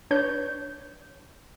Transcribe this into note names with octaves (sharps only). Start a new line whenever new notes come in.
D4 B4 C#5 G6